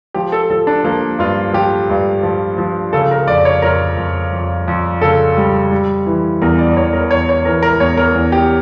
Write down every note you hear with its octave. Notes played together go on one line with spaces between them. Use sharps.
F3 G4
A4
F3 A4
D4
F3 A#3
G2 F4
F3 G4
G2
F3
F3
C#3 A4
A#4
F2 D5
C#5
F2 A#4
F2
F2
F2
C#3 A4
G3
G3
E3
E2 A#4
D5
E2 C#5
A#4
E2 C#5
C#5
E3 A#4
A#4
E2 C#5
A#4
E2
G4